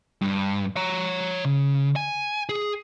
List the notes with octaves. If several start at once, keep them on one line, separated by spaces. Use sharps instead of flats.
G2
C#5 A#5
C#3
G#5
G#4